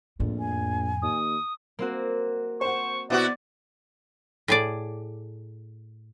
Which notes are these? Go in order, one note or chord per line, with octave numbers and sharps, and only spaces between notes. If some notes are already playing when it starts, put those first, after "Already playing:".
A#1 F2 A2
G#5
D#2 D#6
A#3 C4 F#4
C5 F#5 C#6
B2 B3 E4 F#4 C5 D5
A2 G#4 D5